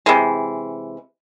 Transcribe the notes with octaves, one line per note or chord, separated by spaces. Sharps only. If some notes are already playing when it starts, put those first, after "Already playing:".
C3 E3 G#3